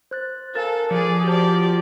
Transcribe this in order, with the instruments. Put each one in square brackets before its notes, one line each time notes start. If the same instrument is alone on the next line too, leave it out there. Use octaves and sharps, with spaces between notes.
[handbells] C5 F#6 A6
[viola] A4 [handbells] A#4 F5 G#5 [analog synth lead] A5
[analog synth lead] F3 [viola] G#4 D5 [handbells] C#7
[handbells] F#4 C5 A5 [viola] G4 D5